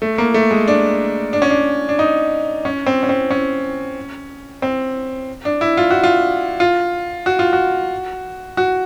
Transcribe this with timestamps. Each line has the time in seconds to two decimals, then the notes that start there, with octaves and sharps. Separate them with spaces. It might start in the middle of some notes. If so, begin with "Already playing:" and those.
0.02 A3
0.18 A#3
0.34 A3
0.51 G#3
0.68 D4
1.33 D4
1.42 C#4
1.50 D4
1.89 D4
1.99 D#4
2.65 C#4
2.86 C4
3.03 C#4
3.09 C4
3.31 C#4
4.62 C4
5.45 D4
5.61 E4
5.77 F4
5.91 F#4
6.03 F4
6.60 F4
7.26 F#4
7.39 F4
7.53 F#4
8.57 F#4